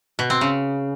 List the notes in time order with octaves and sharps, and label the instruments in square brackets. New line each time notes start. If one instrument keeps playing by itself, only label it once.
[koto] B2
C4
C#3